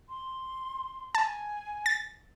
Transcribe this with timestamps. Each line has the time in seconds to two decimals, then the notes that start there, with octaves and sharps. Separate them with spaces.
0.09 C6
1.15 G#5 A5
1.86 A6